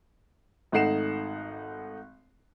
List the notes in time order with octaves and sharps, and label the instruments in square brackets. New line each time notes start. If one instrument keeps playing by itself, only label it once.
[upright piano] G#1 A3 D#4 F#5 C7 E7